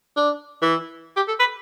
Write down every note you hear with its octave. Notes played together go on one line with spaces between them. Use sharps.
D4
E3
G4
A4
B4